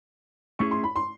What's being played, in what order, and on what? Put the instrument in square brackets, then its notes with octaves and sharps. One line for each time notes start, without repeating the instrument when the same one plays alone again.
[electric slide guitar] A3 C#4 E4 G#4 [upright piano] C#6
[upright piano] C6
B5
C6